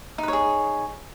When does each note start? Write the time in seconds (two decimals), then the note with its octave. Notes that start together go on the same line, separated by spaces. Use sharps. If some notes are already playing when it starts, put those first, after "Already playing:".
0.18 D#4
0.23 B4
0.28 C#5
0.33 G#4